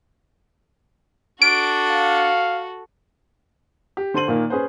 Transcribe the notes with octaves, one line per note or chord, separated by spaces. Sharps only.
D4 F#4 A4 D7
F5
G4
D3 C5 C6 D#7 F#7
A#2 D#3 A#3
C#4 G#4 B4 C5